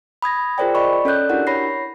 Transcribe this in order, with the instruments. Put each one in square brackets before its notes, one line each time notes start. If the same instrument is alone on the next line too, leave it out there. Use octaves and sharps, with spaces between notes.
[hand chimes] B5 D#6 G#6 A#6
F4 G#4 A#4 C5 D5 G5
D5 D#5 B5 C#6
C#4 A4 C#5 D5 F#6 G6
D4 E4 F#4 G4 A#4 F#5
C#5 B5 A#6 C7